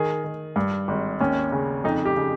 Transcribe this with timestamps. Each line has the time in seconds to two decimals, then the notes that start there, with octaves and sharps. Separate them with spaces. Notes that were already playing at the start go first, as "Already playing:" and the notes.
Already playing: D#3 G#4
0.24 D#3
0.56 G2
0.88 G#1
1.21 D#2 C#4
1.52 C#3
1.84 F2 D#4
2.05 G4
2.16 C#3